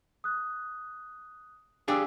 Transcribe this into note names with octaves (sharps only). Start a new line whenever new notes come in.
D#6 F#6
D4 G4 G#4 F5 D6 E6